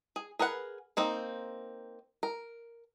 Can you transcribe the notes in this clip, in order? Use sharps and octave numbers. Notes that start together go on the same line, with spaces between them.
G#4
G#4 A#4 B4 F#5
A#3 C4 D#4
A#4